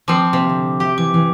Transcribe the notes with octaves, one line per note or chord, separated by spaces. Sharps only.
F3 C4 D6
D#2 C3
D3
G4 E5
E3 D6
E3